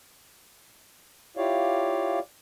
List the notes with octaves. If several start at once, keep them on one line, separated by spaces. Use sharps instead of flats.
E4 F4 G4 C#5 D5 F5